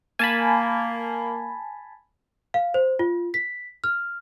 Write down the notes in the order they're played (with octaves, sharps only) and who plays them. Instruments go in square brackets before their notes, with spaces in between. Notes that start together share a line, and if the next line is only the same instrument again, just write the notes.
[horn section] A#3 [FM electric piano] G#5 A5 B5
[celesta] F5
C5
F4
B6
F6